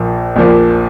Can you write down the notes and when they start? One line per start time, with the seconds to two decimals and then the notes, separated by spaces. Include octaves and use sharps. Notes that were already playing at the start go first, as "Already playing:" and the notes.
Already playing: A#1 A#2 F3
0.36 A#1 A#2 F3